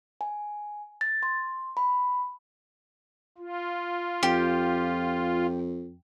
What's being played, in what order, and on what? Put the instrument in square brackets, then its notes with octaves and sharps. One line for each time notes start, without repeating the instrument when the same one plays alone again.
[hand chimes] G#5
A6
C6
B5
[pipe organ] F4
[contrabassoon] F2 [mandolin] G4